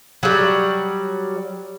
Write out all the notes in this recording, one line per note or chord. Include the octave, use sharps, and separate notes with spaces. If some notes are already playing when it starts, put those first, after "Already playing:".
F#3 G3